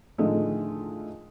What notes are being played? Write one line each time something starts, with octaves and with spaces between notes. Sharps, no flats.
A2 D3 D#3 F3 G#3 A3